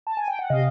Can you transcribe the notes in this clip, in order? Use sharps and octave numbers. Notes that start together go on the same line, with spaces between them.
A5
G#5
G5
F#5
C3 D#5 F5